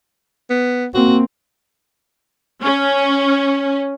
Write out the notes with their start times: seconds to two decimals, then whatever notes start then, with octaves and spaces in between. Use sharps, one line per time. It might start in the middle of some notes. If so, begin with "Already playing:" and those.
0.50 B3
0.94 A#3 C4 F#4
2.63 C#4